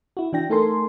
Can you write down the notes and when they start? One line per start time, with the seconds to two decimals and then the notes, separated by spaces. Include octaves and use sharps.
0.17 E4 F#4
0.33 E3 D4 G5 A#6
0.50 A3 D#4 A4 A#4 G#5 C6